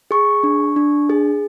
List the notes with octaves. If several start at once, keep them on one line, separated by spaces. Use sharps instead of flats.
G#4 C#6
D4
D4
G#4